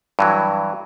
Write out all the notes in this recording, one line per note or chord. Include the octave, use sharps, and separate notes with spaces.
G2 E3 F#3